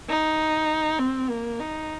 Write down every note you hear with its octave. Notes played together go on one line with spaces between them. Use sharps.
D#4
C4
A#3
D#4